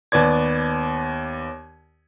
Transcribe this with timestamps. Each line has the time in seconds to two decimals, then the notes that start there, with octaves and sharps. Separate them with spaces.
0.12 D#2 B3 D5 G#6